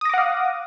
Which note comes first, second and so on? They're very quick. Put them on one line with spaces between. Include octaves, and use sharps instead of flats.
D#6 A#6 D6 F#5 F5